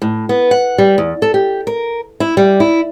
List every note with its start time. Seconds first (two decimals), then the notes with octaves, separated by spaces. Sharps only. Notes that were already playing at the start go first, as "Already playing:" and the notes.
0.02 A2
0.29 B3
0.51 F#5
0.78 G3
0.98 E2
1.22 A4
1.34 G4
1.67 A#4
2.20 E4
2.37 G3
2.60 E4